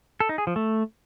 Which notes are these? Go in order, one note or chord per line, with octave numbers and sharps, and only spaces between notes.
A4
D#4
G#4
F3
A3